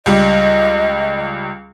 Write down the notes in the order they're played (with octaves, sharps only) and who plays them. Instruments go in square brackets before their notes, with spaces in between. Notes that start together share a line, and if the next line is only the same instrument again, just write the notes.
[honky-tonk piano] C#2 G3 [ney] D#5